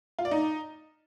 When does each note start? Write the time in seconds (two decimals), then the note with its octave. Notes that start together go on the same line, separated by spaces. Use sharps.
0.19 F4
0.25 D5
0.31 D#4